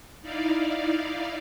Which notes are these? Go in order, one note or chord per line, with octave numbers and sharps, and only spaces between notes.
D#4 E4 D5 F5